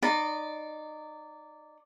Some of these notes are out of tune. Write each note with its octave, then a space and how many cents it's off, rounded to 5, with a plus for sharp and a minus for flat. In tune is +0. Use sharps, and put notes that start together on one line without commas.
D#4 -25 D5 -10 B5 +0